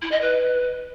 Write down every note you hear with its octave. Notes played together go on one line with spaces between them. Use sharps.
E4
D#5
B4